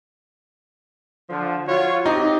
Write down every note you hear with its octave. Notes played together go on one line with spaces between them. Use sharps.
D3 F3
F4 F#4 C#5
C4 D#4 G4 D#5